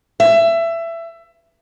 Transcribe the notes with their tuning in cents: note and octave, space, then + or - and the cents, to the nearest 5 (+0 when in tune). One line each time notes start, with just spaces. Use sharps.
E5 +20